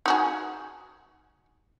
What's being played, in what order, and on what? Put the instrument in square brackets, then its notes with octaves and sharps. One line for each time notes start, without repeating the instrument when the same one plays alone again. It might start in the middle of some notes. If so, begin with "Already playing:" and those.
[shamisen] D#4 F#4 G#4